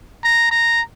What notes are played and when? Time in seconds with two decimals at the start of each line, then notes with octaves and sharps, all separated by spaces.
0.24 A#5
0.51 A#5